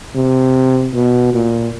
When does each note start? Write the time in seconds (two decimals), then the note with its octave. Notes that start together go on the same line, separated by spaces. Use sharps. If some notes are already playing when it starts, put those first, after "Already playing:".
0.15 C3
0.94 B2
1.34 A#2